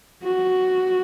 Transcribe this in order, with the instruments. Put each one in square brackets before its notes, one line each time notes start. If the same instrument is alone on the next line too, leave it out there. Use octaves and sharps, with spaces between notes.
[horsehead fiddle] F#4